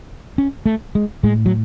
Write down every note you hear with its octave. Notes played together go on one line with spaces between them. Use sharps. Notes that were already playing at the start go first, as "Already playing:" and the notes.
C#4
A3
G#3
A2 G#3
F#3